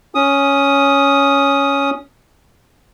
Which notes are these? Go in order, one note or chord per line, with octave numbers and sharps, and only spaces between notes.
C#4 D#6